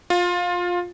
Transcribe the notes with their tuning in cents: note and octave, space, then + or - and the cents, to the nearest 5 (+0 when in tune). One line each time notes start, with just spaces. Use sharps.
F4 +15